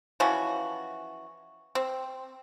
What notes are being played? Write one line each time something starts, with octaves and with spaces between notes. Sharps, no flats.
E3 F3 C#4 F#4
C4